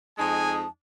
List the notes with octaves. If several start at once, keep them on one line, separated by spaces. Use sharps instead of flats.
F2 G#3 D#4 G#5 A5